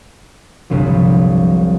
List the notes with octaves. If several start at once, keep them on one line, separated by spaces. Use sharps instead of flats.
G1 C2 F3 F#3